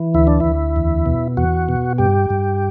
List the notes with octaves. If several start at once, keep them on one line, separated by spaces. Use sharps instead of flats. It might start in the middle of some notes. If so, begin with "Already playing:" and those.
Already playing: E3
D2 E4
D4
D2 E4
E2
B2
E2 F#4
B2
G2 G4
G2